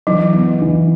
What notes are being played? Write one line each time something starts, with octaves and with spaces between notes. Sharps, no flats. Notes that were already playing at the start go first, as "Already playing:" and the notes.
E3 F#3
B3
E3